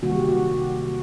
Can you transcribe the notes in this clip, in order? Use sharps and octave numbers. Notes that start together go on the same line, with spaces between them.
C3 D#3 G3 A#3 F#4
G4
F#4